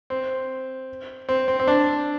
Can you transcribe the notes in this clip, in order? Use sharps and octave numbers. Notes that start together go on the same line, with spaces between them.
C4
C4
C4
C4
D4